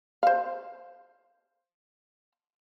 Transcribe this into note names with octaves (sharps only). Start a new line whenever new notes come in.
C5 F5